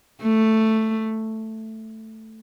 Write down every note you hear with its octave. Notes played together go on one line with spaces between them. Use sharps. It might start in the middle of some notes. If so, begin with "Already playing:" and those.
A3